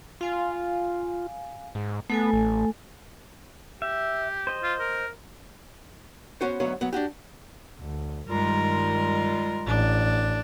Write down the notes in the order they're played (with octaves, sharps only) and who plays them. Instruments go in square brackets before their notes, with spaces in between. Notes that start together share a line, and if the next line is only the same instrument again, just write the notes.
[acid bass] F4 [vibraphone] F5 G#5
[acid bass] G#2
[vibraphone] A3 A4 G#5 [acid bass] B3
[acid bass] A1
[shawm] G4 [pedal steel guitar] E5
[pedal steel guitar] C5 D#5
[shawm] F4
A#4
[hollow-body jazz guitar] B3 C#4 F#4 C5
D2 G#2 F#3 B3 C#5 F5
F#3 B3
D4 D#4 F#4 G4
[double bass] D2
[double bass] G2 D#3 [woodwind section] G3 G#3 F4 [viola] A#4
[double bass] A1 [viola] D4